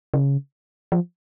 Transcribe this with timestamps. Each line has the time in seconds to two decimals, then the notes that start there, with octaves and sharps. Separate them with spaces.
0.14 C#3
0.92 F3